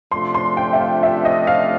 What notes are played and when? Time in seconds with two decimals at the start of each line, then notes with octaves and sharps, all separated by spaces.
0.12 C3 F3 A3 D4 F4 C6
0.34 C6
0.57 G5
0.73 E5
0.79 F5
1.03 E5
1.25 D#5
1.47 F5